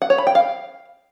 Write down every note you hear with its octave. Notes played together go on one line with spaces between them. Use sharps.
F#5
C#5
B5
G5
F5